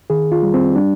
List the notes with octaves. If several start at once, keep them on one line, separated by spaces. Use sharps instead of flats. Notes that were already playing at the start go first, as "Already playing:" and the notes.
D#3 G#4
F4
G3
C4
G3 D4